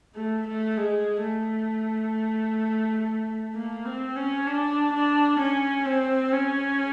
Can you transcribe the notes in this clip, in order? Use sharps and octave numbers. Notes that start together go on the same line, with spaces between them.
A3
A3
G#3
A3
A#3
C4
C#4
D4
D4
C#4
C4
C#4